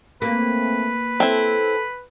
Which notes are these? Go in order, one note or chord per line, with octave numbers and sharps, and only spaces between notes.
A3 A#3 C4 B4
C4 E4 A4